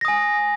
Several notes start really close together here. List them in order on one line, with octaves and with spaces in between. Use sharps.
A#6 D#6 G#5